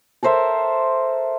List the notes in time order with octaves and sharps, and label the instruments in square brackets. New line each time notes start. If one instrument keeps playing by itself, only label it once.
[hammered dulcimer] A4 A#4 C5 E5